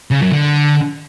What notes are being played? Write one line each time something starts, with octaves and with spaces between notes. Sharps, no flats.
C#3
F#2
D3